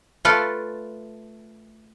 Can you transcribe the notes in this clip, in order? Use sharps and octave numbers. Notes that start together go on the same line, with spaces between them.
A3 F4 A4 B4 D5